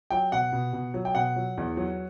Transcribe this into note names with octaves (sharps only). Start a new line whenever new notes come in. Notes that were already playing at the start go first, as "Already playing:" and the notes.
F#3 G5
B2 F#5
B2
B2
F#3
G5
B2 F#5
F#3
E2
F#3